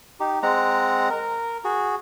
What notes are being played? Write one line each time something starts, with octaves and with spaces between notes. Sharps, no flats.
D#4 G4
G#3 C4 F#5 A#5
A#4
F#4 G#4